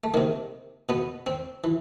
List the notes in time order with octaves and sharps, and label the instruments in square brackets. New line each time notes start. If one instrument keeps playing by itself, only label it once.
[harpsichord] A3
C3 D#3 A#3
B2 B3
C4
E3